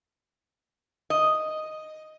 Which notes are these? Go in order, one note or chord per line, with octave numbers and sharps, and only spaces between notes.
D#5